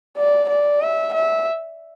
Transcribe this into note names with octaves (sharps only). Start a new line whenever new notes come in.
D5
D5
E5
E5